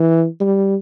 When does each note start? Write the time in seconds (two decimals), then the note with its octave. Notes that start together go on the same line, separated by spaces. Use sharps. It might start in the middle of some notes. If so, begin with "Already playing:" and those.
Already playing: E3
0.40 G3